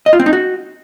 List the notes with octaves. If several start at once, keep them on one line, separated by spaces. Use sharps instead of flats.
D#5
F4
C4
D#4
F#4